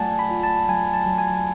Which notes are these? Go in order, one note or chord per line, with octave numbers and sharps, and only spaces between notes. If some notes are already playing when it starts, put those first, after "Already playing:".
Already playing: F#3 A3 F4 D5 F#5 G#5 A5
B5
F4
A5
F#3 G#5
A5
F#3
G#5